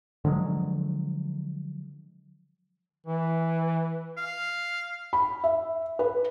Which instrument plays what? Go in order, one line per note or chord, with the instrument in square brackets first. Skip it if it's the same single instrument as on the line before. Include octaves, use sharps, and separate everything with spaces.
[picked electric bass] D3 F3 F#3 G#3
[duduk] E3
[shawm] F5
[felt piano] B5
E5
B4